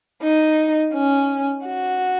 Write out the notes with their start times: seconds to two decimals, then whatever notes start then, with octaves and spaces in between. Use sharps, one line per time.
0.22 D#4
0.93 C#4
1.65 F#4